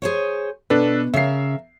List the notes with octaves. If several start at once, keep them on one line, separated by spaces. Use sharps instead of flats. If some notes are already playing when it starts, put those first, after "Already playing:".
G#4 C5 C#5
B2 D4 A4 B4
C#3 A#4 E5 C7